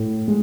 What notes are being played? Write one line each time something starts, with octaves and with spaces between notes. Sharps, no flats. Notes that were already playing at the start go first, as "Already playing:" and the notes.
Already playing: A2
G#3